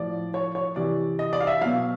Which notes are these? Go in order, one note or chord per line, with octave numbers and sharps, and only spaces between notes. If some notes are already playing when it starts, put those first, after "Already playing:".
Already playing: A2 F3 D5
C#5
C#5
C3 E3 D5
D#5
D5
F5
E5
B2 F#3 F5